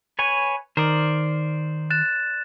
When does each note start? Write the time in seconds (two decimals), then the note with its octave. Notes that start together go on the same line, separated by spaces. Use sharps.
0.19 B4 C#5 G#5
0.77 D#3 A#4 C5 D5
1.90 F#6 A6 E7